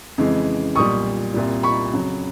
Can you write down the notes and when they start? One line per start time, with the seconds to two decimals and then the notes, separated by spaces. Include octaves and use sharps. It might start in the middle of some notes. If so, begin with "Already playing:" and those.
0.18 F2 C#3 E3 G#3
0.76 B1 A#2 G3 C#6 D#6
1.34 C2 A#2 G3
1.63 B5 C#6
1.93 F2 C#3 F#3